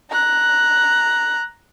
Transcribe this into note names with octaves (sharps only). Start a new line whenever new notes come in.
A#5 F#6